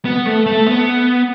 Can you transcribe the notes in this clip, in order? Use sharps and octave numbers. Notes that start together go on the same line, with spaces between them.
B3
A3
A3
B3